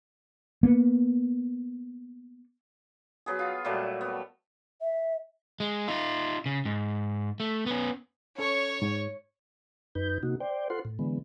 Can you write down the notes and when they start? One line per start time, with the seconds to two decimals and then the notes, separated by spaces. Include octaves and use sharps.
0.63 A#3 B3
3.26 F#3 B3 G#4
3.39 F4
3.65 A#2 F#3 G3 A3
4.01 B3
4.82 E5
5.60 G#3
5.88 D#4 F4
6.46 C#3
6.65 G#2
7.40 A3
7.66 B3 C#4
8.38 C#4 A4 C#5
8.82 G#2
9.95 F#2 D#4 B4 G6
10.23 C3 A#3 D#4 F#4
10.40 C5 D5 G5
10.70 F4 A4 C5 F#5 C6
10.85 A2
10.99 D3 E3 G#3 B3